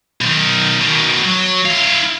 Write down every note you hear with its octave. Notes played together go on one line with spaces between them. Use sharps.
B1 D#3
B2 D#3
F#3
E4 F5